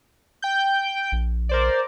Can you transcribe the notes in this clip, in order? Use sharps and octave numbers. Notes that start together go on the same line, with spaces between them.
G5 G6
A#1
A#4 C5 D5